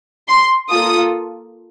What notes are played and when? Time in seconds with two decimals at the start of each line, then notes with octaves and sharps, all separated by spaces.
0.28 C6
0.69 A#3 F4 A4 D#6